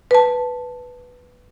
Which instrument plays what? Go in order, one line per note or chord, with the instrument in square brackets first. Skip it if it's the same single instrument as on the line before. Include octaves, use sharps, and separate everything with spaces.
[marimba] B4 A5